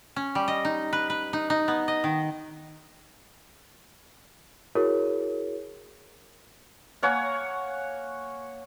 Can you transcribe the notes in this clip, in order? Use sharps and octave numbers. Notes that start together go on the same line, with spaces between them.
C#4
G3
D#5
D#4
B4
B4
D#4
D#4
B3
D#5
D#3
E4 F#4 G#4 A#4 C#5
A#3 C#5 F#5 G#5